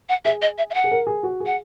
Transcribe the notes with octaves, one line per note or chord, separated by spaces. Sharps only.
F#5
G#4 E5
D#5
E5
E5
F#5
G#4
A#4
G#4
F#4
G#4
F#5